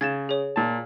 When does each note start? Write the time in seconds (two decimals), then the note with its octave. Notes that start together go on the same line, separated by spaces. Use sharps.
0.01 C#3 G#6 A6 E7
0.29 G#4 C#5
0.56 A#2 A5